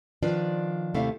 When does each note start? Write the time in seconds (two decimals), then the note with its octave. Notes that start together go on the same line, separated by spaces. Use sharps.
0.23 D#3 F3 D4 F4 B4 D5
0.94 D#2 C3 A3 E4 F5